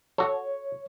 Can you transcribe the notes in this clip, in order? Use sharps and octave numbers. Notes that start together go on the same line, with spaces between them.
F#4 A4 C#5